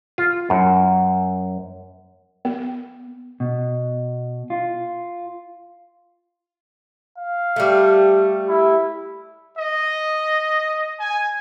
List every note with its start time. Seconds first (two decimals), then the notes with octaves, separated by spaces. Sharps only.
0.18 F4
0.50 F#2
2.45 B3
3.40 B2
4.50 F4
7.18 F5
7.56 G3 A3
8.49 E4
9.57 D#5
11.00 G#5